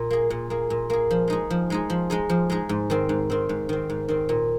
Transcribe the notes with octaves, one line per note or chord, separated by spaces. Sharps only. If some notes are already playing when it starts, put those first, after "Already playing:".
Already playing: A#2
A#3 G#4
A#2
A#3 G#4
A#2
A#3 G#4
F3
G#3 D#4 G#4
F3
G#3 D#4 G#4
F3
G#3 D#4 G#4
F3
G#3 D#4 G#4
G#2
D#3 C4
G#2
D#3 C4
G#2
D#3 C4
G#2
D#3 C4
A#2